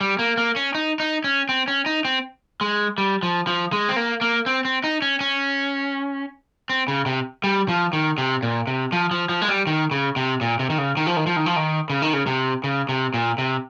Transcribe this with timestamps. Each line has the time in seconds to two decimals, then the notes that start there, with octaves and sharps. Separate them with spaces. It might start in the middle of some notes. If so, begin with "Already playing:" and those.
0.01 G3
0.19 A#3
0.37 A#3
0.56 C#4
0.75 D#4
1.00 D#4
1.24 C#4
1.49 C4
1.68 C#4
1.86 D#4
2.05 C4
2.61 G#3
2.98 G3
3.23 F3
3.47 F3
3.73 G#3
3.89 C4
3.96 A#3
4.21 A#3
4.46 C4
4.65 C4
4.84 D#4
5.02 C#4
5.21 C#4
6.69 C4
6.88 C#3
7.06 C3
7.44 G3
7.68 F3
7.93 D#3
8.18 C3
8.43 A#2
8.67 C3
8.92 F3
9.11 F3
9.29 F3
9.42 G#3
9.48 G3
9.67 D#3
9.91 C#3
10.16 C3
10.41 A#2
10.59 C3
10.70 D#3
10.78 C#3
10.97 D#3
11.07 F3
11.17 D#3
11.27 F3
11.36 D#3
11.46 F3
11.56 D#3
11.90 C#3
12.02 D#3
12.13 C#3
12.27 C3
12.64 C#3
12.89 C3
13.14 A#2
13.38 C3